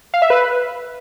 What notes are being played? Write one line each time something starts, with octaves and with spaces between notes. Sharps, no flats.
F5
E5
B4